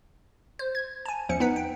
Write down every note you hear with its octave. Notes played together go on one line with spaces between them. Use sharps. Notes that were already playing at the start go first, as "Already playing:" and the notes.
C5
G#6
G#5 A5
E2 F3 C#4 C#7
B3 D#4 B4 F#5
G5